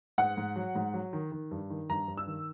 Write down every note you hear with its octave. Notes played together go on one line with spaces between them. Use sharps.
G#2 F#5
G#2
F#3
G#2
F#3
D#3
D#3
G2
D#3
G2 A#5
G2
E6
D#3